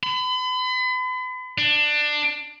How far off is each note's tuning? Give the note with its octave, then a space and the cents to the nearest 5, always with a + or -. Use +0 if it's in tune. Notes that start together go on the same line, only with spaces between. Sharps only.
B5 +40
D4 +15